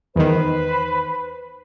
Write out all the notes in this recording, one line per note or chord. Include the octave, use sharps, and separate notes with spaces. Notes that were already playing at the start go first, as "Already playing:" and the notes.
E2 D#3 B4 C5 B5